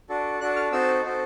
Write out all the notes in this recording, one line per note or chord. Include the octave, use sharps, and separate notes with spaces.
D4 F#4 A4
D4 F#4 A4 F#6
F6
C4 D#4 F#4 A4 E6
C4 D#4 F#4 A4